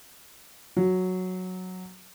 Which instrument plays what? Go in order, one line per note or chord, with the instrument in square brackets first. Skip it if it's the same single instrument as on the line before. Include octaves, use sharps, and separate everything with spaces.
[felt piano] F#3